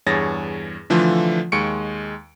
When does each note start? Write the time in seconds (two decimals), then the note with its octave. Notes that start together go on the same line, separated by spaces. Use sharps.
0.06 E2 G2 G#4 C#5 A6 A#6
0.90 D3 E3 F3 A3 F4
1.52 D#2 G#3 C#6 C#7 D7